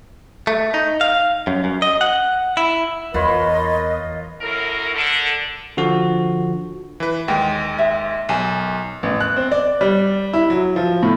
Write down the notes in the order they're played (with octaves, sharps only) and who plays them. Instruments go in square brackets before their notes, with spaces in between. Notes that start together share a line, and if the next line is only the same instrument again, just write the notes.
[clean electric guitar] A3
D#4
F5
F#2
F#2
D#5
F#5
E4
[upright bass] E2 [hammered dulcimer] F4 B4 C#5 [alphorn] A#4 [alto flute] D#5
[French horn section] F#2 A2 A#4
D3
[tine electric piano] D3 F3 F#4
[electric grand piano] E3 B4
[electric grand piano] D#2 G#3 [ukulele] G5
[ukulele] E5
[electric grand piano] B1 [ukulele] A#4 G#5 A5
[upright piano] A1
F#6
C4
D5
G3
E4
F#3
F3
A2